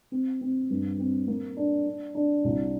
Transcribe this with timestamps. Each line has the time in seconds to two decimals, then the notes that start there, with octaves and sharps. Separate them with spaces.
0.12 C4
0.41 C4
0.70 G2
0.99 C4
1.27 A#3
1.57 D4
1.87 D4
2.15 D4
2.44 C2